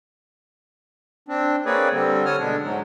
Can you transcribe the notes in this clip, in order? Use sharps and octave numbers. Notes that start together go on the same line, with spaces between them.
C4 D4
A#3 C4 G#4 B4 C#5 D5
D3 G3 C4
G3 A4 C#5 D#6 F6
B2 D3 G#3 D4
G#2 F#3 G#3